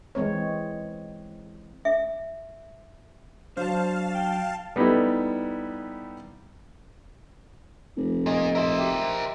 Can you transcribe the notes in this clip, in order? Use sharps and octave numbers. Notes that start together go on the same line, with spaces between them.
E3 G#3 C4 C#5
E5
F#3 D4 C5 F5 A5
G5
G3 B3 D#4 E4 A4
F1
A#2 D#5
A#4 C5 E5
G4